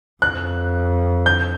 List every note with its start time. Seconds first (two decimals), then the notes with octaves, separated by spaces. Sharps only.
0.22 F2 F#6
1.26 G6